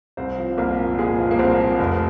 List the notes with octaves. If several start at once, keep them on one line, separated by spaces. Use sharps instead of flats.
C2 C4 C5
F3
C2 A#3 A#4
A#2
A#2 G#3 G#4
F3
A#3
C2 C4
F3
F1